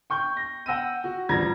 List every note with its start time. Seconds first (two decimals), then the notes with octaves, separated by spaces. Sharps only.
0.10 G5 C#6 G6
0.37 A#6
0.66 F#5 G5 E6 A#6 D#7
1.04 F#4
1.29 A1 F3 G3 A#5 G#6 A#6